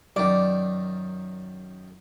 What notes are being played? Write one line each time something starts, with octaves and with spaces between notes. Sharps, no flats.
F#2 D#3 D5